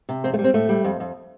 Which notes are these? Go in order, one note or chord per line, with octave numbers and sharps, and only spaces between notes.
C3
F2 C4
A3
G3
C4
A2 A3
G3
F2
F2